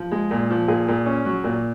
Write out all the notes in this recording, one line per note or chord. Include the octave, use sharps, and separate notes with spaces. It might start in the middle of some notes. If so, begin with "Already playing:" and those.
Already playing: F3
G#3
A#2
F3
A#2 G#4
A#2
C#4
F#3
A#2